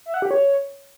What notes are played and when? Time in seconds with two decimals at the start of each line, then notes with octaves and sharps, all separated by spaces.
0.06 E5
0.14 F#5
0.22 G4
0.31 C#5